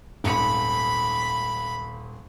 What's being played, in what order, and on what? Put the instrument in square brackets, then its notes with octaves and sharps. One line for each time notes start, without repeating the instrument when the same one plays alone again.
[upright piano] D#1 G#1 C#7 [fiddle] B5